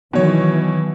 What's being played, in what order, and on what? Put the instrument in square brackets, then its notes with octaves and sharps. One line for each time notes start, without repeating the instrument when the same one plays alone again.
[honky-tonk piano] B2 C#5 [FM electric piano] D#3 F#3 [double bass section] E3